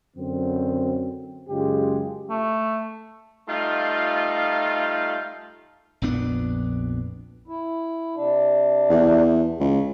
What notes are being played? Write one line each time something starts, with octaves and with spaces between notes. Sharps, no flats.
F#2 D3 C4
F#2 C#3 G#3 F4 G4
A3
G3 A3 D#4 F4
A#1 F2 B3 D4
E4
C3 D4
E2
C#2